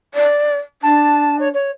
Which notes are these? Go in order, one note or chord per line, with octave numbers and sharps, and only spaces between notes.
D5
D4 A5
C#5
C#5